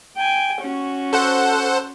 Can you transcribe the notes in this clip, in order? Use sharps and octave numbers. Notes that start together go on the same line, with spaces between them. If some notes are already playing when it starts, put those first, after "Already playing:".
G5 G#5
C#4 F#4
A4 C5 F#5